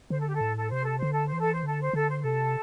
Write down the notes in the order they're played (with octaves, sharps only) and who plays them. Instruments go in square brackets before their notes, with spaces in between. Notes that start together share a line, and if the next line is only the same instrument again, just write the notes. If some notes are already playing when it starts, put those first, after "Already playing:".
[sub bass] D3 [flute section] C5
[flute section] A4
G4
A4
[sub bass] A2
[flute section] A4
[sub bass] C3 [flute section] C5
[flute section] A4
[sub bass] D3 [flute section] C5
[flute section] A4
C5
[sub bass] E3
[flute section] A4
C5
[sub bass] D3 [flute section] A4
[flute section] C5
[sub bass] D3 [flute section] A4
[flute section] C5
[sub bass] C3 [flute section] A4